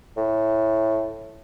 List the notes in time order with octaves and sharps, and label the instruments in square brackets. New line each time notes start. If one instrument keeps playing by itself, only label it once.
[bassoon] A2